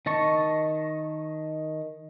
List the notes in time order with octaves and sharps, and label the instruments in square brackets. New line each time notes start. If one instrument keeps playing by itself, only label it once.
[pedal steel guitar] D#3 D#5 A5 C#6